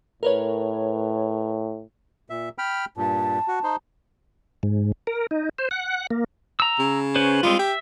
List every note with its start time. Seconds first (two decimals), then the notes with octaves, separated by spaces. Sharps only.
0.23 A2 A#4 B4 C#5
2.30 A#2 E5
2.58 G5 B5 F6
2.97 G2 A#2 A5
3.48 F#4
3.63 D#4 C5
4.63 G#2
5.07 A#4
5.31 D#4
5.58 C5
5.71 F#5
6.11 A#3
6.60 A#5 E6
6.79 C#3
7.16 C#4 B4 C5
7.43 G3 G#3 C4 F4
7.59 G4 E5